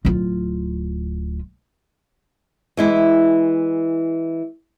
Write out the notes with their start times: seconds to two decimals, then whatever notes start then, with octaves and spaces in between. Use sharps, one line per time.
0.05 D1 F4
2.77 E3 G#3 E4